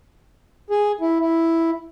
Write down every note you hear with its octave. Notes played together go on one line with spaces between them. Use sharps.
G#4
E4
E4